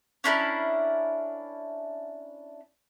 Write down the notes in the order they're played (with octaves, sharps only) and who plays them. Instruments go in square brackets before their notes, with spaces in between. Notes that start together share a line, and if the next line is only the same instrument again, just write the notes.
[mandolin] C#4 D4 E4 A#4